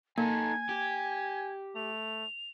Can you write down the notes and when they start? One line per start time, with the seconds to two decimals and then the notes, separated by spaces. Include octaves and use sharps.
0.18 A#3 D#4 A4 G#5 G#6
0.69 G4
1.76 A3 F7